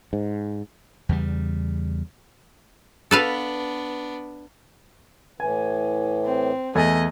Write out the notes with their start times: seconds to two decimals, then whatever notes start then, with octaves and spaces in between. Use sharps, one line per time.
0.13 G#2
1.09 E2 C#3 G3
3.11 B3 D4 A4 B4 F5
5.40 A2 E3 G#5
6.24 C4
6.75 E2 A3 G#4 D#5 G#5